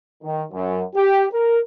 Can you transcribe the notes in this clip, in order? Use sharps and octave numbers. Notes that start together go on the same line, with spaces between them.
D#3
F#2
G4
A#4